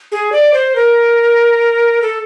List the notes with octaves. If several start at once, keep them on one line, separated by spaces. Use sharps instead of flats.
G#4
D5
C5
A#4
A4